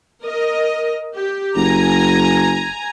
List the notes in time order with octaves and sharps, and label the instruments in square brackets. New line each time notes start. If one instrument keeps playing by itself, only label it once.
[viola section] A#4 D#5
G4
[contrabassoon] F#1 [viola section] G#5 A#5